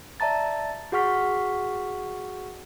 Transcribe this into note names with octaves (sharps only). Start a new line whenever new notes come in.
D5 E5 A5 A#5 A6
F#4 G#4 F#5 C#6 F6 B6